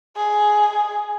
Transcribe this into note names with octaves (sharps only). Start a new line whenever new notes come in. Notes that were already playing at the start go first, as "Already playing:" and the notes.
G#4